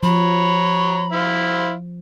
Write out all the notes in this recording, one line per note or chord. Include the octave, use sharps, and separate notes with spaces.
F3 C#5 A#5 B5
E4 C5 F5